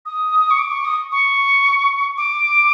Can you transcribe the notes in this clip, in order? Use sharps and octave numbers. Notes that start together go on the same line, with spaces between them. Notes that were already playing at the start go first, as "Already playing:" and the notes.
D#6
C#6
D6
C#6
D#6
C#6
D6